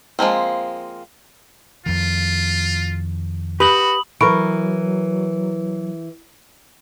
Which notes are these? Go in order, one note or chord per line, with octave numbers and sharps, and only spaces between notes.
F3 G#3 A#3 C4
F2 D#3 F4
F#4 G4 B4 B5 D#6 F#7
E3 F#3 A#4 B5 C#6 D7